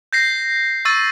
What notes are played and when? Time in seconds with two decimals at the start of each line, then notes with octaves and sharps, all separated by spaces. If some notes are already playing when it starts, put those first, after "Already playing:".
0.13 G6 A#6 C7
0.85 C#6 E6 A6 D#7